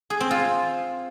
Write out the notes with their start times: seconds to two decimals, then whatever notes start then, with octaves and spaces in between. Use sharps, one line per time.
0.10 G#4
0.20 C4
0.31 F4